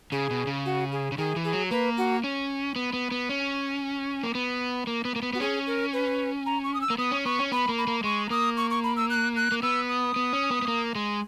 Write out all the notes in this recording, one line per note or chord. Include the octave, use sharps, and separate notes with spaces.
C#3 G#4
B2
C#3
F#4
G#4
C#3
D#3 G#4
E3
G#4
F#3
A#3 B4
F#4
C#4
B3
B3
B3
C#4
A#3
B3
A#3
B3
A#3
B3
B3 F#4
C#4 G#4
A#4
B4
A#5
C#6
D#6
E6
A#3
B3 D#6
C#4
B3 C#6
C#4
B3 B5
A#3
B5
A#3
G#3 C#6
A#3 D#6
C#6
C#6
B5
E6
F#6
F#6
A#3
B3 E6
D#6
B3
C#4
B3
B3
A#3
G#3